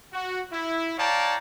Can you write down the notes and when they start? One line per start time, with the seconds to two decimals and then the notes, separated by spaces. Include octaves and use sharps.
0.13 F#4
0.52 E4
0.98 C#5 D5 F5 G5 A5 A#5